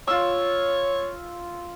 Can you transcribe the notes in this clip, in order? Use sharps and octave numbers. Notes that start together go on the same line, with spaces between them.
F4 C#5 E6